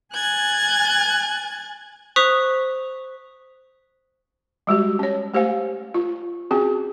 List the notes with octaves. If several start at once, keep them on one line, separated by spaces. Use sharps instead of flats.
G#5 F#6 G#6 A6
C5 C#6 D#6 F#6 B6 F7
G3 G#3 F#4 G4
C#4 C#5
A3 G4 C5 F5 G#5
F4
C4 C#4 F#4 G#4